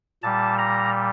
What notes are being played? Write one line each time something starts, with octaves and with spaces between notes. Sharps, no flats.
A#2 G3 A5
A#5